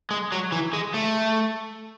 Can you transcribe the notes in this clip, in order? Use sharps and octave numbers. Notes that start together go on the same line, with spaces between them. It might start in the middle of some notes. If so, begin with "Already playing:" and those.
G#3
F#3
E3
G#3
A3